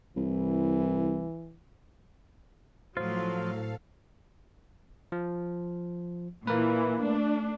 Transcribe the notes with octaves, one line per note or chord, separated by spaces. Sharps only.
C2 E3
A2 F3 F#3 F4 A4 C5 F5
F3
A#2 E3 A#3 A#4 B4
A3 D4